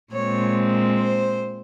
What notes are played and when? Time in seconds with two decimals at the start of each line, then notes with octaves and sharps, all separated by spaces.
0.13 A#2 G#3 C4 C#5
1.00 C5